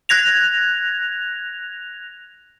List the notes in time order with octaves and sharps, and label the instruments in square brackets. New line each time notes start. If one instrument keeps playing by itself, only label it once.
[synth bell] F#6 G#6 A#6 F7